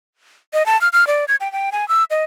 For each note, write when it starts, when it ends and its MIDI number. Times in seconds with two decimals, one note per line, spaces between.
0.53 0.66 75
0.66 0.79 81
0.81 0.89 89
0.93 1.07 89
1.07 1.25 74
1.28 1.36 92
1.41 1.51 79
1.52 1.70 79
1.72 1.88 80
1.89 2.04 88
2.11 2.24 75